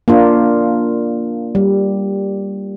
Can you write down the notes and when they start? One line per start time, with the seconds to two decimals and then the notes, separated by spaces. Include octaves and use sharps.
0.08 A#3 D4 F4
1.55 G3